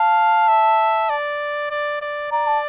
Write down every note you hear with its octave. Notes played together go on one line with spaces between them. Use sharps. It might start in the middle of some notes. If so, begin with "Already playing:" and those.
Already playing: F5 A5
E5
D5
D5
D5
D5 A#5
A5